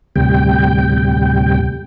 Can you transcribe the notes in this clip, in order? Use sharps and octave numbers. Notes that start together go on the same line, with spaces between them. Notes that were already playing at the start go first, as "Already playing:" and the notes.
D2 A2 C3 G3 G5